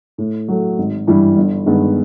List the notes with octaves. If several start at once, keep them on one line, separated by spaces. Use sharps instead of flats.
A2
F#3 A3
G#1
G2 E3 G3
G1
G2 D#3 G#3 B3